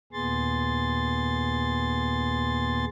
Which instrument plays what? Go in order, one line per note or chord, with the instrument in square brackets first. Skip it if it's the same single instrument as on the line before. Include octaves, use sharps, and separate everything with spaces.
[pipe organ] D#2 A#2 B3 G#4 C6 A6